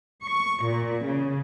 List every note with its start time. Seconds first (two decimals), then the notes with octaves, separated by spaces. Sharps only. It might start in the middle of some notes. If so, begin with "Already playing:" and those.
0.22 C#6
0.65 A#2
1.03 C#3